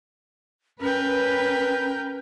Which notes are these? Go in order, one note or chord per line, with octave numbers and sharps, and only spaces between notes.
C#4 A#4 B4 G5